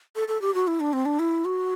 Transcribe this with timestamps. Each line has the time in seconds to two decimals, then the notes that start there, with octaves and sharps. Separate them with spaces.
0.16 A4
0.28 A4
0.42 G4
0.54 F#4
0.67 E4
0.80 D4
0.93 C4
1.05 D4
1.19 E4
1.45 F#4